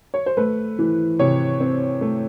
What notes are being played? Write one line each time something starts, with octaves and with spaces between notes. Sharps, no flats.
C#5
C5
A3 B4
E3
C3 C#5
C4
A3